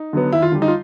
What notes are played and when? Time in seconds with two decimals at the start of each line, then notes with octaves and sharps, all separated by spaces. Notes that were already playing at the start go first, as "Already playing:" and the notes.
Already playing: D#4
0.13 D3 F#3 B3
0.32 D#2 E4
0.42 F4
0.52 D3 G3
0.62 D#4
0.68 F4